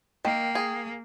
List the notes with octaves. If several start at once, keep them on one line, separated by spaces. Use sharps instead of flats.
D#3 A#3 G5
G#4